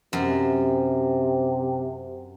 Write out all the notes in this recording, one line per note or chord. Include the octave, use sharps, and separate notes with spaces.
F#2 C3